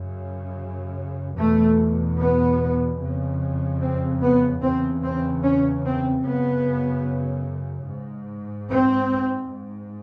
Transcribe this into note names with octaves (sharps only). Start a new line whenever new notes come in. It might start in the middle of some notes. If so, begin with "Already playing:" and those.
Already playing: F#2 C#3
E2 B2 A3
B3
F2 C#3
C4
B3
E2 C#3 C4
C4
C#4
C4
F#2 C#3 B3
G#2
C4
G#2